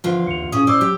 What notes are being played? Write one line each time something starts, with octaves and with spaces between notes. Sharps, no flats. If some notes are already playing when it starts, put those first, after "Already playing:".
E2 D3 F3 F4
D#2 C#7 F7
A2 C#4 F4 G#4 D#6
A2 C#4 C5 D5 D6 E6
F#3 G4